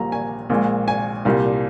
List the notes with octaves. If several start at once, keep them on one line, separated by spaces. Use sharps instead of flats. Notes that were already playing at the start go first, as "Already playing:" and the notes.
Already playing: A#1 A#2 G3 A#5
G#5
A#1 A#2 G#3
G#5
C2 A#2 G3